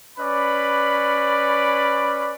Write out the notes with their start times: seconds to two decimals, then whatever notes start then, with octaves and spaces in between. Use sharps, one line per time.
0.18 C#4 B4 D5 B5